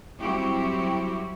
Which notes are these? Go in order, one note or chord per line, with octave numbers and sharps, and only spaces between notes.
F#3 G3 C4 E4 F#4 G4